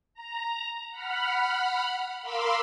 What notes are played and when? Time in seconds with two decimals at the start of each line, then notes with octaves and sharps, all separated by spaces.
0.14 A#5
0.91 F#5 B5 F6
2.22 A#4 F5 B5 C6 D6 E6